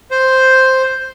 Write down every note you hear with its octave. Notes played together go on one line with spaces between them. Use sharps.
C5